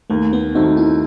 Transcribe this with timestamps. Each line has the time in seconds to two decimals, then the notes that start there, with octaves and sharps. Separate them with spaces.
0.10 D#2 A3
0.33 B3
0.55 D#3 A3 C4 D#4 F#4
0.77 E4